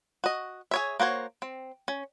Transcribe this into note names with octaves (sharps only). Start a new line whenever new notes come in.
F#4 D#5
G#4 C#5 E5
A#3 F#4 C5 C#5
C4
C#4